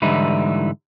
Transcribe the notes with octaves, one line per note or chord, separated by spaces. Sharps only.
G#2 D3 E3 G3 D#4 E4